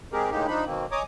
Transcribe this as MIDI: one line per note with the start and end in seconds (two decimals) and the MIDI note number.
0.12 0.30 56
0.12 0.30 60
0.12 0.30 67
0.12 0.30 68
0.12 0.30 70
0.31 0.47 45
0.31 0.47 50
0.31 0.47 56
0.31 0.47 58
0.31 0.47 63
0.31 0.47 67
0.47 0.65 53
0.47 0.65 62
0.47 0.65 63
0.47 0.65 83
0.66 0.86 47
0.66 0.86 51
0.66 0.86 58
0.66 0.86 60
0.92 1.03 73
0.92 1.03 75
0.92 1.03 80
0.92 1.03 82
0.92 1.03 86
0.92 1.03 87